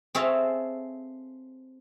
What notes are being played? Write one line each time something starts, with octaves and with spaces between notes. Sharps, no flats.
C4 G#4 A4 C#5 E5 F5